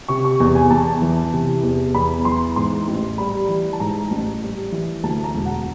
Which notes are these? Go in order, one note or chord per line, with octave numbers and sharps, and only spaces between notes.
C3 C#6
C#6
E2
G#5
E2 A5
E3
C3
E2
E2 B5
E3 C6
G#2 C6
A1
G3 B5
E3
A5
G#2 A#5
A1
G3
E3
D2 A5
A#5
E1
F#5